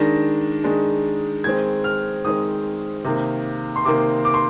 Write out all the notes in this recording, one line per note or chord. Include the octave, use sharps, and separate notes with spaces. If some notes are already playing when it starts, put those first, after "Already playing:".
Already playing: D#3 G#3 D4 A#6
D#3 G#3 D4
D#3 G#3 C4 G#6
F6
D#3 G#3 C4 D#6
C3 D#3 A#3
C6
C3 D#3 A#3 D6
D6
C6